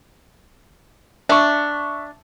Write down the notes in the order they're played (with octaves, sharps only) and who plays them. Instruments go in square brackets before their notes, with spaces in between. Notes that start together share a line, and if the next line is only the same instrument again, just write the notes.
[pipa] D4 [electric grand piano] E5 C#6